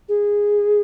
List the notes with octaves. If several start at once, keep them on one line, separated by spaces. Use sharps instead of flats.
G#4